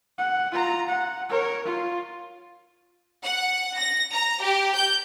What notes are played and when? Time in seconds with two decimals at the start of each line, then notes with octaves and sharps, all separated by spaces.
0.18 F#5
0.51 F4 A#5
0.88 F#5
1.29 A#4 C#5
1.65 F4
3.23 F#5
3.76 A#6
4.12 A#5
4.41 G4
4.74 G6